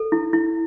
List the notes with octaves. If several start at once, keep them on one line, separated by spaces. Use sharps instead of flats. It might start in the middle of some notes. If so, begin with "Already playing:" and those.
Already playing: A4
E4
E4